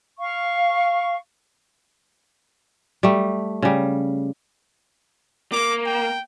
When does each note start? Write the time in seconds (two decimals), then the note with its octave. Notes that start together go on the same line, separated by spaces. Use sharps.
0.20 F5 C#6
3.03 G3 A3
3.62 C#3 G3
5.52 A#3 D6
5.86 G5